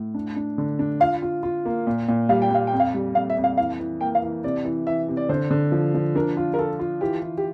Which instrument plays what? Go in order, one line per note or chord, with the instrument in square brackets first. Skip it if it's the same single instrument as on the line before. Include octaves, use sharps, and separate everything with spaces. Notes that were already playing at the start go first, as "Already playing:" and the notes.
Already playing: [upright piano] A2
D4
D4
D3
D4
[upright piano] F4 [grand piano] F5
[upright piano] F4
F4
A#3
A#2
A#2
[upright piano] G3 [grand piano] F5
[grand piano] G5
[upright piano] G3 [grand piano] F5
[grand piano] G5
[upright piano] F2
[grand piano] F5
[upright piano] G3
[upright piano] F2 [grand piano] F5
[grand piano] E5
[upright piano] F2
[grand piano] F5
[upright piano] E3 [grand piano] F5
[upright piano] E3
[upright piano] A#3 [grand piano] G5
[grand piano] F5
[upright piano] E3
[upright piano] C3 [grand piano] D5
[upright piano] E3
[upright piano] E3 [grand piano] E5
[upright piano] C3
[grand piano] D5
[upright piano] D3 [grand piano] C5
[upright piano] D3
F3
F3
[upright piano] D4 [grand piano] A#4
[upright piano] F4
[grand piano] A#4
[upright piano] F4 [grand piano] A4
[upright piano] F4
[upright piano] E3 [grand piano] G4
[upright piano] E3
[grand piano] G4